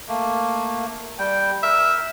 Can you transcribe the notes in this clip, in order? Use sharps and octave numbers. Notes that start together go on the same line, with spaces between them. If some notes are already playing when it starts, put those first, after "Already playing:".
A3 A#3
G3 G5
A#4 E5